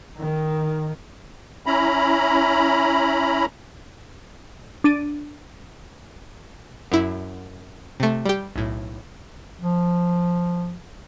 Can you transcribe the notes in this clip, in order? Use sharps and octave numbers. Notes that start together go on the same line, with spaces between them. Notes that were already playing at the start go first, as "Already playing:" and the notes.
D#3
C#4 E4 A#5 B5
D4 A6 D7 D#7
F#2 E4
C3 A3
G3 G4
B1 A2
F3